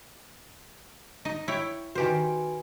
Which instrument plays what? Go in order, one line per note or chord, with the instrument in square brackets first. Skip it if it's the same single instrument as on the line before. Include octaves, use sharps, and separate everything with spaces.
[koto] D#4 D#5
E4 C#5 G5
[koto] D#3 G4 C5 [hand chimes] F#4 B4 G#5